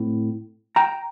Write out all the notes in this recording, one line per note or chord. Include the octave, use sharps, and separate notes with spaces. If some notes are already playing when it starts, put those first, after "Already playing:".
Already playing: A2 C4
G5 A#5